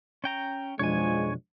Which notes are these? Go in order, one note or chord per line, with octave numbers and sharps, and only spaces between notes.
C#4 G5 A#5
B1 F2 F3 G#3 D4 C#5 G#5